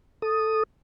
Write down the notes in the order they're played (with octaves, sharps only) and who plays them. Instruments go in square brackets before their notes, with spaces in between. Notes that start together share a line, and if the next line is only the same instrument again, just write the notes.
[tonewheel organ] A4 D#6